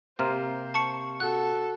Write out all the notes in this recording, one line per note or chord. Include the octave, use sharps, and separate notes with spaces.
C3 A#3 C5 A#5 C6 F6
A5 C#6 C#7
F#4 A4 F#6